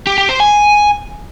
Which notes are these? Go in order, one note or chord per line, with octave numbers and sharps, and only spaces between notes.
G4
G4
C5
G#5